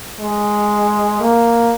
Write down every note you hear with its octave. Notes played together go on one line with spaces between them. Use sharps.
G#3
A#3